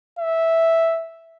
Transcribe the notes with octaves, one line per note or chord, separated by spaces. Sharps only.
E5